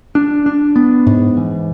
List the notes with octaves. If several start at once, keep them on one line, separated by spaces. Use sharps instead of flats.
D4
D4
B3
G#2
E3